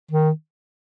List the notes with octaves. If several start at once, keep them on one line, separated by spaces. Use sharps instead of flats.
D#3